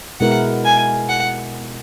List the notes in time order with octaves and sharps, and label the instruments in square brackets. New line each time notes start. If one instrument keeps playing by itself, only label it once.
[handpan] B2 G#3 B3 E4 A#4 [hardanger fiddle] F#5
[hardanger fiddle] G#5
F#5